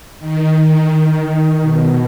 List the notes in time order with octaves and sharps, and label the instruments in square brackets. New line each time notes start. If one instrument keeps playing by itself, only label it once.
[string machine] D#3
B2